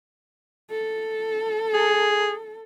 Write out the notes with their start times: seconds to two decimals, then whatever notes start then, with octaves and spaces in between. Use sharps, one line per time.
0.71 A4
1.74 G#4